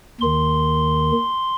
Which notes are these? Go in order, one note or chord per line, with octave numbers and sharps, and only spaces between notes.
D#2 D#3 C6